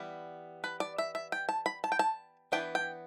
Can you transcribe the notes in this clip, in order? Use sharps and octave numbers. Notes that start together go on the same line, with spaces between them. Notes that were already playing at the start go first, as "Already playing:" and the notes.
Already playing: E3 G3 B3
B4
D5
E5
E5
G5
A5
B5
A5
G5
A5
E3 B3 D4 G5
G5